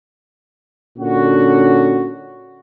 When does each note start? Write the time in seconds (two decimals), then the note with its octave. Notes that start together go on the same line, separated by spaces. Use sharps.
0.97 A#2 D3 C#4 F#4